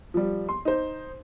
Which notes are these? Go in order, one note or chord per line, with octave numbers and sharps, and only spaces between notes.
F3 G3
C6
D#4 C5